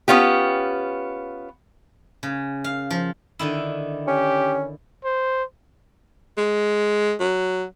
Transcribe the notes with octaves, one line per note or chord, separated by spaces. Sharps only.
B3 C#4 F4 G4
C#3
F5
F3
D3 D#3 E4
C#4 G4
C5
G#3
F#3